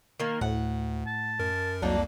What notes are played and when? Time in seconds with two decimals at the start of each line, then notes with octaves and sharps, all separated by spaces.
0.20 D#3 A#3 A#4
0.41 D2 A2 F#5
1.07 A5
1.39 F#2 A#4
1.82 C2 F2 F#3 A#3 D4 D#4